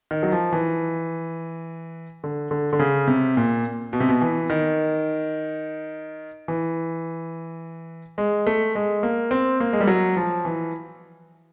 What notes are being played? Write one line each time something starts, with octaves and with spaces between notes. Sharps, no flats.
D#3
F#3
F3
E3
D3
D3
D3
C#3
C3
A#2
B2
C3
B2
E3
D#3
E3
G#3
A3
G#3
A#3
C4
A#3
G#3
G3
F#3
F3
E3